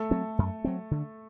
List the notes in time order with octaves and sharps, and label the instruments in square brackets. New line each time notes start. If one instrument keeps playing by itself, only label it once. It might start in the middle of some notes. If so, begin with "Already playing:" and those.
Already playing: [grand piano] A3 A4
[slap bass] F#3 C4
F#2
F#3 C4
D3